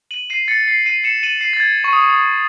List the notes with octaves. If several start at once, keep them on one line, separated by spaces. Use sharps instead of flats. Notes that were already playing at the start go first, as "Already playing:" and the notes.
D#7 F#7
C7 D#7
A6 C#7
C7
C7 D#7
C#7 E7
D#7 F#7
C7 D#7
A6
G#6
C#6
D#6
C#6
D#6